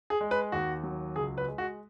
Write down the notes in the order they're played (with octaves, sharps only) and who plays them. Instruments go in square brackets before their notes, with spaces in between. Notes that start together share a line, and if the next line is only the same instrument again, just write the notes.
[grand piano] G#4
G#3
B4
D#2 F#4
F#3
C#2 G#4
B4
G#3
F#4